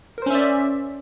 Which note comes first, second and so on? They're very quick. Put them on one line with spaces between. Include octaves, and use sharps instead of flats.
A#4 C5 C#4 E5 D5